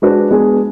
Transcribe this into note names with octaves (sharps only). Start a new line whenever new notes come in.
G#3 D4 F#4 B4
G#3 B3 D4 G#4